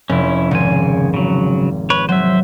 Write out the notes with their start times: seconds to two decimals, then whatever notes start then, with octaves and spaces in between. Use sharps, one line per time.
0.10 F1 C#4 E4
0.51 G#1 C#3 G#5
1.14 C#3 F#3
1.90 B4 C#5
2.09 F#3 C5 E5